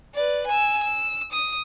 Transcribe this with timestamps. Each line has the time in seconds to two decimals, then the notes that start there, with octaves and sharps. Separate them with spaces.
0.14 B4 D5
0.47 G#5 E6
0.83 E6
1.32 D#6